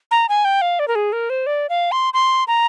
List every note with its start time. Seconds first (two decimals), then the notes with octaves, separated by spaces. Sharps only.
0.11 A#5
0.29 G#5
0.45 G5
0.62 F5
0.79 D5
0.88 A#4
0.95 G#4
1.13 A#4
1.30 C5
1.46 D5
1.69 F5
1.92 C6
2.14 C6
2.47 A#5